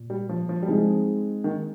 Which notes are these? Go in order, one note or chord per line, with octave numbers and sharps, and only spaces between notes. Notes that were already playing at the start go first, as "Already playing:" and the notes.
Already playing: A#2
G3
F3
F3
G3
F3 G#3 C4 D#4 G#4
D#3